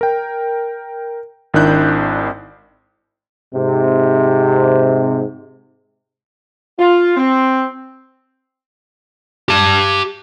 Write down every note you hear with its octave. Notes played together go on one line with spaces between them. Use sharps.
A#4 G5
G#1 D#3 D4 E4 F#6 G6
G#2 C3
F4
C4
G4 A5